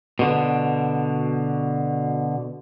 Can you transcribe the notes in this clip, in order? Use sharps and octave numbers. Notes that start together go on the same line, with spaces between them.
B2 D3